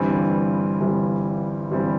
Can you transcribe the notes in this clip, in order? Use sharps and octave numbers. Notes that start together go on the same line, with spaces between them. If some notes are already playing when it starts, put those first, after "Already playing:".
Already playing: G1 G2 E3 G3 C4
G1 G2 E3 G3 C4
G1 G2 E3 G3 C4